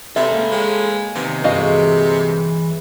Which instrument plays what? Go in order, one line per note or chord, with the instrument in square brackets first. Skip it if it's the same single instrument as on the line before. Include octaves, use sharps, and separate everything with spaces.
[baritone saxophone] C3 [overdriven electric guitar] A4 B4 [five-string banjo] E5
[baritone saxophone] C#2 [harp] A#3 F5
[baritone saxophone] G#3 [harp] C#5 G5 G#5
[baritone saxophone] C3 [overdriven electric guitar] D#3 [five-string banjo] B3
[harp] G1 G#3 [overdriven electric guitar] E3 [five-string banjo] F#4 D#5 F5